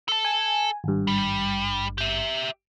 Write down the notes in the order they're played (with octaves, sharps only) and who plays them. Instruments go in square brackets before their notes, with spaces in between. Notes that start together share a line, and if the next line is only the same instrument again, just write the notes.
[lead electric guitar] A4 A5
[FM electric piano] G#5
G#1 G2
[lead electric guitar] G3
G4 E5